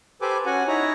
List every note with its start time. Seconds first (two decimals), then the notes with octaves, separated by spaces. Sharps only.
0.21 G4 A4 B4 C5 G#5 D6
0.46 C#4 F#4 F#5 G#5
0.68 D#4 E4 C#5 A#5